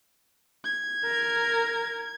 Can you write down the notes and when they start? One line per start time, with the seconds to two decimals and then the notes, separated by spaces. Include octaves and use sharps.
0.64 G#6
1.05 A#4